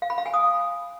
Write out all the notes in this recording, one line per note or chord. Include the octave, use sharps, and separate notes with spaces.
F5
B5
F5
G#5
D#6